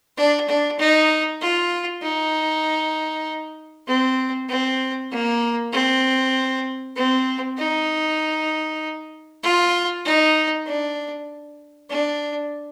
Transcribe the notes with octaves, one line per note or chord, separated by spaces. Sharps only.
D4
D4
D#4
F4
D#4
C4
C4
A#3
C4
C4
D#4
F4
D#4
D4
D4